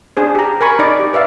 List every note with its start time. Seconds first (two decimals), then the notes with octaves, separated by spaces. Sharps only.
0.17 D4 G#4 C5
0.35 G4 A#5
0.61 A#4 G#5 B5 C#6
0.79 D#4 D5
0.99 G4
1.13 B4 D5 E5 F5